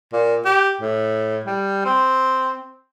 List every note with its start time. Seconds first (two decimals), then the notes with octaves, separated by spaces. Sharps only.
0.13 A#2
0.45 G4
0.81 A2
1.46 G3
1.85 C4